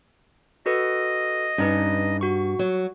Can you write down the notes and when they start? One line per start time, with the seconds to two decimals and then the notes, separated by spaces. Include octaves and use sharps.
0.66 F#4 A4 B4 D#5
1.58 G2 C#4 D#4 B4
2.21 F#4 C#6
2.59 F#3